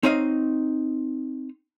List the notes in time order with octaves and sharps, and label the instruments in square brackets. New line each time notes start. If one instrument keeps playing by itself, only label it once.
[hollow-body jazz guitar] C4 D#4 C#5 D#5 F5